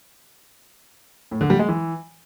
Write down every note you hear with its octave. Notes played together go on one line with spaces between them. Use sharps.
A2
D3
G3
G#3
E3